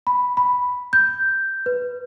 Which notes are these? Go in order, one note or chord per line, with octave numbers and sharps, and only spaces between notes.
B5
B5
G6
B4